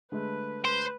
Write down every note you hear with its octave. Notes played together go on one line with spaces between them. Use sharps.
D3 G#3 A3 B4
B4 C5 C6